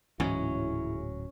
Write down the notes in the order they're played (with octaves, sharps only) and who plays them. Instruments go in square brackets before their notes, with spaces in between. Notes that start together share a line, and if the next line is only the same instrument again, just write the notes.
[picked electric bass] D1 F#3 [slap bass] G#2 E3 [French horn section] C#3 E4 [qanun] C#4